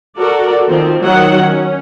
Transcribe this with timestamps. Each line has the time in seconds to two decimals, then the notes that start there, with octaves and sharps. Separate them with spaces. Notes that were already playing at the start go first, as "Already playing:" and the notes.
0.17 F#4 A4 A#4 D5
0.68 D#3 F3 C4 F4
1.00 D#3 F#3 F#5
1.39 C#4